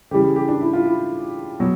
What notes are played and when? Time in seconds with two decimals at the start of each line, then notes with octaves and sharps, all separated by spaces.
0.11 C#3 E3 G3 G4
0.24 G#4
0.36 G4
0.48 D4
0.61 E4
0.73 F4
0.85 E4
1.60 B2 F#3